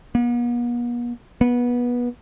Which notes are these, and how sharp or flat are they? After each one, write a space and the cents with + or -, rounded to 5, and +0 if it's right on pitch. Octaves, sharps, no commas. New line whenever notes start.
B3 -45
B3 -20